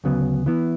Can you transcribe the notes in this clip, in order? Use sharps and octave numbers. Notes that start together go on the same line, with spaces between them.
D2 C#3 F#3 B3
E3 B3 E4